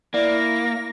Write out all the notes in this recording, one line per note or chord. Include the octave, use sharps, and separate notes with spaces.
A#3 E4 D5 A#6